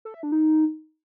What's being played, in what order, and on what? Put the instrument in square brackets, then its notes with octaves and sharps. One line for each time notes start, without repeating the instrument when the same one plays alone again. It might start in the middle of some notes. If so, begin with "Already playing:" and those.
[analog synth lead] A4
E5
D4
D#4